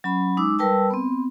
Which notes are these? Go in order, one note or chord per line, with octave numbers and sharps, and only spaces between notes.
F#3 C#4 B5
G#3 D#4 D6 E6
G3 A#4 B4 G5 A5 E6
B3 C4